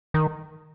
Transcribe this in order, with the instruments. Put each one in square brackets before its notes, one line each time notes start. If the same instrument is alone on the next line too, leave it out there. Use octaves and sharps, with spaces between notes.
[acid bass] D#3